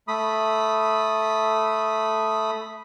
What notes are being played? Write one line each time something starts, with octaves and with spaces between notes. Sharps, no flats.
A3 B5 D#6